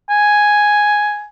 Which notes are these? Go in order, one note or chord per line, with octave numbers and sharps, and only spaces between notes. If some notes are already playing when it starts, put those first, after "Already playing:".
G#5